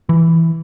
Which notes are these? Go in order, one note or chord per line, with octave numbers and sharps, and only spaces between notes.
E3